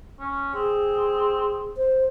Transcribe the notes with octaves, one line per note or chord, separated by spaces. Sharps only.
C#4
C4 G#4
C5